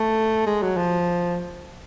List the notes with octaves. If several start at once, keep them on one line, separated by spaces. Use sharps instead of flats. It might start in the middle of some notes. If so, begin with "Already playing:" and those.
Already playing: A3
G#3
F#3
F3